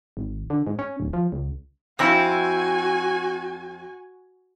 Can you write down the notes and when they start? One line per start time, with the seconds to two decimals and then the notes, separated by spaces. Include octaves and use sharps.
0.17 G#1
0.50 D3
0.67 G#2
0.79 C#4
1.00 D1
1.13 F3
1.32 C#2
1.99 F2 C4 E4 F#4 G#5